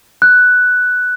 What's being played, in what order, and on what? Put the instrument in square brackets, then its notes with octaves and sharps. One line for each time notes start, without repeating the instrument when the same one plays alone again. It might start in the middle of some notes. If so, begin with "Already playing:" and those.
[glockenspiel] F#6